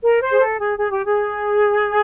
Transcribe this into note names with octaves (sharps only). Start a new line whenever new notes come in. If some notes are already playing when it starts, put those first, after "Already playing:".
A#4
C5
G#4
A4
G#4
G#4
G4
G#4